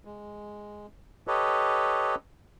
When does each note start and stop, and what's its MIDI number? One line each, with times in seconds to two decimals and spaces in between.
0.05 0.87 56
1.27 2.15 67
1.27 2.15 69
1.27 2.15 71
1.27 2.15 73
1.27 2.15 75